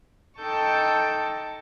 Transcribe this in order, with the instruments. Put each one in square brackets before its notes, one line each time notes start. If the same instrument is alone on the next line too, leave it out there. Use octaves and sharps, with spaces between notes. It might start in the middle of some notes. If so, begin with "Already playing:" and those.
[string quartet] D#4 A4 G5 A5 C#6 G6